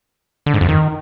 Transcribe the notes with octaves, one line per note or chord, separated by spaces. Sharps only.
D3
G#2
F2
D#3